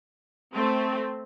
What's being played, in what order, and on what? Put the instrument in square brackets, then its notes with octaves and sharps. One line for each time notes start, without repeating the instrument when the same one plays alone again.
[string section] A3 C4